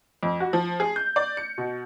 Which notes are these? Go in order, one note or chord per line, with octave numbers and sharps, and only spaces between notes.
F2
F#4
F3
G#4
G6
D5
C#7
B2